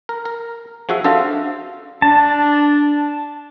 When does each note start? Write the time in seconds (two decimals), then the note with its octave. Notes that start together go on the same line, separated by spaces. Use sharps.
0.09 A#4
0.25 A#4
0.89 F3 F#4 G#4 E5
1.04 D4 F#4 A4 C5 E5 F5
2.02 D4 A5